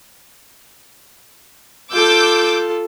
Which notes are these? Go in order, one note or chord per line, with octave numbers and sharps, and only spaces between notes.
F4 A4 D6 E6 G6